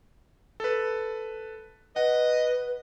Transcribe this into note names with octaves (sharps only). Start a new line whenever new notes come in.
A4 B4
B4 D#5 F#5